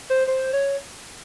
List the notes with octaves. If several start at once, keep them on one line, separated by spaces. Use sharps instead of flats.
C5
C5
C#5